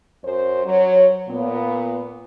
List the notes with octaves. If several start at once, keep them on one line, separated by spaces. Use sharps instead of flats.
F#2 C5
F#3 C#5
A#2 B3